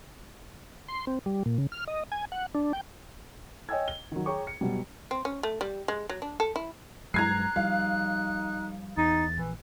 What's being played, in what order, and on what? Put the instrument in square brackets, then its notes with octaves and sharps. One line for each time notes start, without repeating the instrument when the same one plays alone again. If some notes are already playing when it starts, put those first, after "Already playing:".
[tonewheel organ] C6
C4
G3
A#2
C#3
F6
D#5
G#5
F#5
D4
G5
[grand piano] C#5 D#5 G5 G#5 E6 G#6
G7
D#3 F#3
G#4 C#5 G5 A#5 C#6 D6
C#7
B2 F#3 G3
[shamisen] C4
C#4
A3
G3
G#3
F#3
D4
A4
E4
[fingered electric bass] G2 F#3 G#3 [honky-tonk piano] A#5 G#6 C7 [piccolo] F#6
[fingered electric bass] F3 G3 [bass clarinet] D#4 [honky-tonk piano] F5
[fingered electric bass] E2 [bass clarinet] D#4 [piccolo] A6
[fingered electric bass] A#1 [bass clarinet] E3